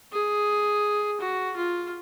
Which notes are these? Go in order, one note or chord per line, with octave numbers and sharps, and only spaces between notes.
G#4
F#4
F4